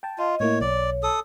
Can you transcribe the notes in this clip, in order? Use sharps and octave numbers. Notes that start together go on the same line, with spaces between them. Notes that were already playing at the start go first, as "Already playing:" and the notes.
G5 A5
F4 D#5
A2 A#3 E4 C#5
B1 C#5 D5
A4 D#6